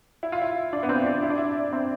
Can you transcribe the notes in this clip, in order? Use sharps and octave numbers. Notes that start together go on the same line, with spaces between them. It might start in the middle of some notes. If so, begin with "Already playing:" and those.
E4
F4
E4
D4
B3
C4
D4
E4
D4
E4
C4